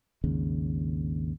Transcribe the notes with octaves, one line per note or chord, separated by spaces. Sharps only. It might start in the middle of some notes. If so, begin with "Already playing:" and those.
G#1 D#2 C#3